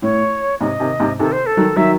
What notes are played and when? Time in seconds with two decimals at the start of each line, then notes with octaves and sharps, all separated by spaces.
0.02 A2 C#5
0.60 G#2 C3 D#5
0.80 C3 D#3
1.00 G#2 C3
1.19 C3 D#3 A4
1.32 C5
1.46 A4
1.57 D#3 F#3
1.77 D#3 F#3 E5